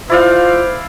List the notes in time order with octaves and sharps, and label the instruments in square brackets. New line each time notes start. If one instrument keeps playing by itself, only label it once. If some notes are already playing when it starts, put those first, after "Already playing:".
[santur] E4 D5 F5 [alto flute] F4 [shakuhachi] C5